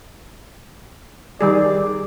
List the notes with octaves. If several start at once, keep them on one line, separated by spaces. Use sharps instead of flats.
D#3 G3 G#4 D5